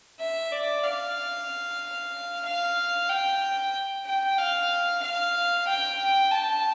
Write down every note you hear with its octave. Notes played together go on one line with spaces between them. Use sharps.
E5
D5
F5
F5
G5
G5
F5
F5
G5
A5